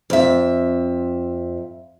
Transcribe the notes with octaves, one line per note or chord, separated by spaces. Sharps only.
F2 E5